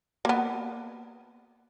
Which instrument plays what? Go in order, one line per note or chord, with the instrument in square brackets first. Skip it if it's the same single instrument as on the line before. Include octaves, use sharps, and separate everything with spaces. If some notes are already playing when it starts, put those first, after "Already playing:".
[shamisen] A#3 B3